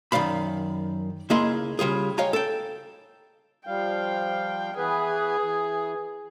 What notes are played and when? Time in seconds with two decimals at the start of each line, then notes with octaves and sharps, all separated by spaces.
0.12 F#2 D#3 G3 D5 F5 B5
1.30 C#2 A#3 E4 G#4 D#5 C6
1.79 C#3 G3 F4 G#4
2.18 C#5 D#5 F5 G5 G#5 A#5
2.33 A4 G5
3.67 F3 G3 F5 G5
4.77 E3 B3 G#4 B4
5.42 E3